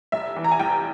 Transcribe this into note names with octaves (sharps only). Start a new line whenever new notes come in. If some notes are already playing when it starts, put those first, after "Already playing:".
F1 E5
E3
A#5
G#5
F1 G5